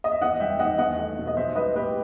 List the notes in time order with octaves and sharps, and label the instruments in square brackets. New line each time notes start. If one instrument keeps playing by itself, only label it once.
[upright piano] D#5
E5
E2 D#5 F#5
G3 E5 G5
D#3 D#5 F#5
E2 D#5 F#5
A3
B2
D#5
B1 C5 E5
G3 B4 D#5
A2 G4 B4